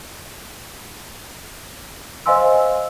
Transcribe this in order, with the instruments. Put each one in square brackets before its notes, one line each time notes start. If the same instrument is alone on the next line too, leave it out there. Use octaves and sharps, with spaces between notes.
[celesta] C5 D#5 F5 G#5 C6 E6